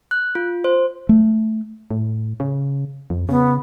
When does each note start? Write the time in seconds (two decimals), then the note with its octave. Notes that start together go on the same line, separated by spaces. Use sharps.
0.11 F#6
0.35 F4
0.64 C5
1.09 A3
1.91 A2
2.40 C#3
3.10 F2
3.29 C#3 B3